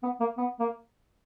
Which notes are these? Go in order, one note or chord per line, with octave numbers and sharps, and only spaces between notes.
B3
A#3
B3
A#3